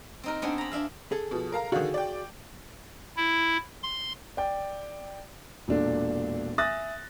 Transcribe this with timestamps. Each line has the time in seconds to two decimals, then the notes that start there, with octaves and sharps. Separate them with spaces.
0.24 C4 D#4 A#4
0.42 B3 C4 D4 G#4
0.58 A#5 B5
0.72 D4 E5 F5
1.12 G#4 A4
1.31 B2 F3
1.52 A#4 F5 A#5
1.72 D3 D#3 F#4 G#4 F5
1.94 D5 G5
3.17 E4
3.83 C6
4.37 D5 G5
5.68 E1 A#2 D4 A4
6.58 E5 G#5 D#6 F#6 A6 A#6